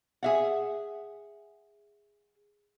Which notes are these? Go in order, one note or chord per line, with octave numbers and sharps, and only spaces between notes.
G#4 E5 F#5